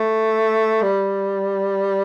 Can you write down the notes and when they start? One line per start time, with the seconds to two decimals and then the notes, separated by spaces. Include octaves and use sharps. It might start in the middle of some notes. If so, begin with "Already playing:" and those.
Already playing: A3
0.82 G3